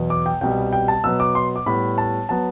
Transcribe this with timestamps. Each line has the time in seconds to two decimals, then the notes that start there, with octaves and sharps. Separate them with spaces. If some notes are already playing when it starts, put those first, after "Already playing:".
Already playing: E2 B2 F#3 B3
0.10 D6
0.26 G5
0.41 C2 B2 G3 G5
0.73 G5
0.88 A5
1.04 B2 F#3 B3 E6
1.20 D6
1.35 C6
1.56 D6
1.66 A2 G3 B3 B5
1.98 A5
2.29 F#3 B3 A5